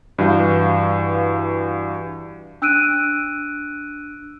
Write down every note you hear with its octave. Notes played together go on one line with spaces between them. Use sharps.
G2 E3 F#4 F5 G6
D4 E6 F#6 D7 D#7